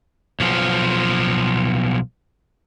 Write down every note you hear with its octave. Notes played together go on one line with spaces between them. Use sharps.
B1 F3